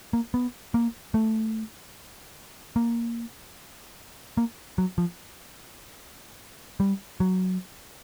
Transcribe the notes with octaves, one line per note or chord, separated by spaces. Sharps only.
A#3
B3
A#3
A3
A#3
A#3
F#3
F3
G3
F#3